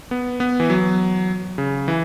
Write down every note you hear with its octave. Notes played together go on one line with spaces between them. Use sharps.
B3
B3
E3
F#3
C#3
E3